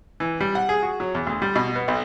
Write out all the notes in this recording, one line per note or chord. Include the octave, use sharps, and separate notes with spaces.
E3
G3
F#5
G#4
F#4
F#3
E2
D2
G3
B2
B3
B1